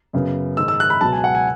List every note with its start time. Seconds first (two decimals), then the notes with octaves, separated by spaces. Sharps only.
0.13 F#2 C#3 F#3 B3
0.57 G#2 D#3 G#3 E6
0.68 E6
0.80 F#6
0.90 B5
1.01 C#2 B2 F#3 A5
1.13 G#5
1.24 F#5
1.35 G#5